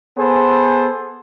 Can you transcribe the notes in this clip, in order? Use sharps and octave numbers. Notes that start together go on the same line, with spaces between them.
B3 G#4 A4 C5